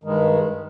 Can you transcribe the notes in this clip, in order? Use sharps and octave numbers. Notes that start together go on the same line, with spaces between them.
G2 D#3 G#3